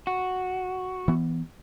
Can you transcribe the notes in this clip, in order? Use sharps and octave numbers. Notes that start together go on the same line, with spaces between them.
F#4
E3 B3